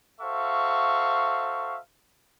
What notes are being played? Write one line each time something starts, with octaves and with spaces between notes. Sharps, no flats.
F#4 A4 C5 E5 F5 C#6